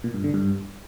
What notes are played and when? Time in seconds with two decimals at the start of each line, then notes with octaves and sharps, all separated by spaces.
0.04 A#2
0.14 G2
0.24 D3
0.34 G2